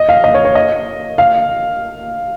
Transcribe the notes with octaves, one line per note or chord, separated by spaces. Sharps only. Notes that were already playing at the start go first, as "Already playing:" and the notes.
Already playing: D#5
F5
D#5
C#5
C#5
D#5
F5